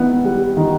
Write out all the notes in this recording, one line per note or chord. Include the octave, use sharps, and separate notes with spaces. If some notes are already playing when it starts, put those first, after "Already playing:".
Already playing: D#3 B3 E4
G3
D#3